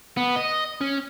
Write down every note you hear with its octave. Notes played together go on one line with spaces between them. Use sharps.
B3
D#5
C#4